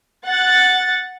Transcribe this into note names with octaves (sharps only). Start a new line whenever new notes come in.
F#5 A6